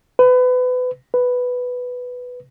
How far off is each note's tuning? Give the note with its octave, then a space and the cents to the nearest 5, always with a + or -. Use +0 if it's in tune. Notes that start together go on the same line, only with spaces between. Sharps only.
B4 +30
B4 +5